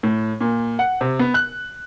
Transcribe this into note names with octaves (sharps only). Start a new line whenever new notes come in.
A2
A#2
F#5
C3
B3
F#6